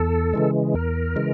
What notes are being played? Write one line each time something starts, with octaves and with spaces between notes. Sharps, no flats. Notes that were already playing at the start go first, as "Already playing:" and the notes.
Already playing: E2 A4
C#3 E3 G#3
E2 A#4
C#3 E3 G#3